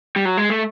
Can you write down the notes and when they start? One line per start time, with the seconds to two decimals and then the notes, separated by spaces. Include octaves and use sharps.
0.16 G3
0.25 F#3
0.37 G#3
0.50 A3